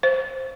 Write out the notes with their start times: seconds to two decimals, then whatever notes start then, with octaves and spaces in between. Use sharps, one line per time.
0.03 C5